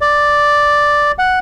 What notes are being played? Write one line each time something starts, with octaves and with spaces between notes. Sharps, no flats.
D5
F#5